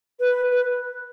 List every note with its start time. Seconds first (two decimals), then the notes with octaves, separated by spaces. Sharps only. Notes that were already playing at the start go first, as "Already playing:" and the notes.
0.20 B4
0.51 B4